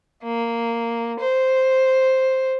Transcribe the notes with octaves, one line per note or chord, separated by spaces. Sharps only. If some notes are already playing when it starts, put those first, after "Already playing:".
A#3
C5